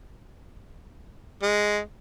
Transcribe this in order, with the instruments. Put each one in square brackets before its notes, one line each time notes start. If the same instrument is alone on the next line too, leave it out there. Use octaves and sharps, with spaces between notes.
[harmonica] G#3